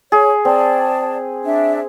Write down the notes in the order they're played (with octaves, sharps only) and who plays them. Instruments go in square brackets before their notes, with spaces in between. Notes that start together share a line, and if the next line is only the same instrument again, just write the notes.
[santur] G#4 [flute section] C#5
[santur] C4 [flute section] D5 A5
[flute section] D4 E5